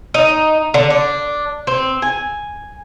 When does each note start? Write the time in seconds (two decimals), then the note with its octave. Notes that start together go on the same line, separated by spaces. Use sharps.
0.14 D#4
0.74 D3
0.90 D4
1.67 C4
2.02 G#5